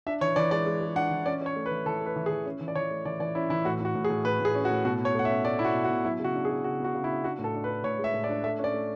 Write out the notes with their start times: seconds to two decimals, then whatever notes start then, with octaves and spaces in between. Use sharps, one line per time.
0.06 D4 E5
0.21 E3 C#5
0.36 E3 D5
0.51 G#3 D5
0.66 G#3
0.81 G#3
0.96 D4 F#5
1.11 E3
1.26 C#4 D5
1.41 C#4 C#5
1.56 A3
1.66 B4
1.71 E3
1.86 E3 A4
2.01 A3
2.06 B4
2.16 E3
2.26 G#4
2.30 E3
2.46 C#4
2.61 E3
2.68 D5
2.75 E3 C#5
2.91 A3
3.05 E3 D5
3.20 E3 D5
3.35 C#4 E4
3.50 E3 E4
3.65 A2 F#4
3.80 A2 F#4
3.95 A2
4.05 G#4
4.10 A2
4.25 A2 B4
4.40 A2 G#4
4.55 C#4
4.65 F#4
4.70 A2
4.85 B2 F#4
4.99 B2
5.05 C#5
5.15 A3 F#5
5.25 E5
5.29 C#4
5.45 A3 D5
5.59 B2 E4
5.65 F#4
5.75 B2
5.84 F#4
5.90 B2
6.05 F#3 E4
6.19 C#3 F#4
6.34 D4
6.45 G#4
6.49 F#3
6.64 C#3 F#4
6.80 B3 F#4
6.94 C#3
7.04 E4
7.09 D4
7.24 D4 F#4
7.39 A2
7.44 A4
7.54 D4
7.64 B4
7.69 D4
7.84 A2 C#5
7.98 G#3
8.04 E5
8.14 A2
8.24 D5
8.29 D4
8.44 A3 E5
8.59 C#4
8.64 D5
8.74 A3